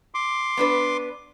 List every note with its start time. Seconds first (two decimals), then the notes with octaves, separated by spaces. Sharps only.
0.14 C6 D6
0.57 B3 D4 B4